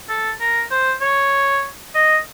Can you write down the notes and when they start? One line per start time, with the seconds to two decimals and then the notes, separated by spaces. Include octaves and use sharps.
0.09 A4
0.40 A#4
0.71 C5
1.01 C#5
1.95 D#5